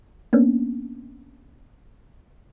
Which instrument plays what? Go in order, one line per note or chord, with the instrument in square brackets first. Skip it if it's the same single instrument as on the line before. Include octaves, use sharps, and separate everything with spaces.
[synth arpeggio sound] A#3 B3 C#4 D4